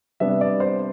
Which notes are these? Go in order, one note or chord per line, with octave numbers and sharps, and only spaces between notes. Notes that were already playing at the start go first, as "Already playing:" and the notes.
C3 G3 B3 D4 E5
D5
C5